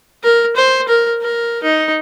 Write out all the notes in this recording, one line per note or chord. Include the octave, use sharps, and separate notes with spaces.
A#4
C5
A#4
A#4
D#4